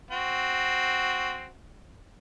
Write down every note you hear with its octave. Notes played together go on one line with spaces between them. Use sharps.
C4 F#4